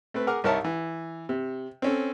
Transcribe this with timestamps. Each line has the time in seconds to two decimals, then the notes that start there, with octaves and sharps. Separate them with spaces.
0.14 A3 C4 B4
0.27 G#4 A#4 F#5 D6 F6
0.44 C2 D#4 A#4 C#5 E5 A5
0.64 E3
1.29 C3
1.82 C4 C#4 A4